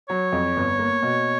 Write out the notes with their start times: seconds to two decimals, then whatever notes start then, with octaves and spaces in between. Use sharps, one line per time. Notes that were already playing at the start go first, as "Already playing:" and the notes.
0.09 F#3 C#5
0.32 F2
0.57 G1
0.79 A#3
1.02 B2